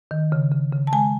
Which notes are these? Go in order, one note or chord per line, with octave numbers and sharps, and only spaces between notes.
D#3
C#3
C#3
C#3
A5
G#3 G#5